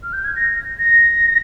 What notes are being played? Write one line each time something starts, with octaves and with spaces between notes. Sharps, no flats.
F6
G6
G#6
A#6
A#6